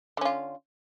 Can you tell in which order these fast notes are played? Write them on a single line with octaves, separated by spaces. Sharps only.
D3 C#4 F4